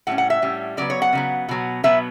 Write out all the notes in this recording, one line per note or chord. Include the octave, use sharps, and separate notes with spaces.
A2 G3 C#4 F#5
F#5
E5
A2 G3 C#4
C#3 F#3 B3 D5
C#5
F#5
C#3 F#3 B3
B2 F#3 B3
B2 F#3 B3 E5